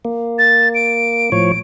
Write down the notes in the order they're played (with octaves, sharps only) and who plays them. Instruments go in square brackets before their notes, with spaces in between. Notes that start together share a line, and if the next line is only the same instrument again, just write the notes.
[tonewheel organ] A#3
[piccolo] A6
D7
[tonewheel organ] A2 F3 C#5